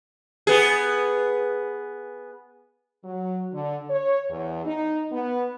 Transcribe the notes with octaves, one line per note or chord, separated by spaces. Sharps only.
B3 G#4
F#3
D3
C#5
E2
D#4
B3